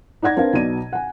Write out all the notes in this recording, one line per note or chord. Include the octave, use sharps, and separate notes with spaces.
D#4 D5 F#5 G#6 A#6
C4 D4 A#4 B4 F5
B1 B2 D5 D#7
F#5 G#5